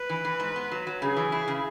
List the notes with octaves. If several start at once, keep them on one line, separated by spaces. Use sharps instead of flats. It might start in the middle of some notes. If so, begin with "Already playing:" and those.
Already playing: B4
E3
E3
G#2
B3
F#3
F#3
C#3 G#4
E3
E4
C#3